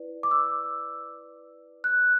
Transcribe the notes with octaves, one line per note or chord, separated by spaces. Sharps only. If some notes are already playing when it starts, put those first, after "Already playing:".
Already playing: E4 B4 D5
D6
E6
F#6